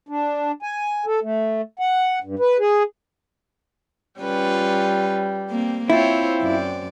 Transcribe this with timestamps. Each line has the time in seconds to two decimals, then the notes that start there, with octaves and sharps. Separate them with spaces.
0.09 D4
0.63 G#5
1.06 A4
1.23 A3
1.79 F#5
2.24 G2
2.39 B4
2.59 G#4
4.21 G3 C#4 F4 B4
5.50 A#3 C4
5.90 C4 E4 F4 C5 C#5
6.41 F#2 D5